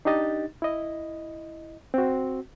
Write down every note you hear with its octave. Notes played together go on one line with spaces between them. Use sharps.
D4 D#4 G4 D#5 A6
E4 D#5
C4 F#4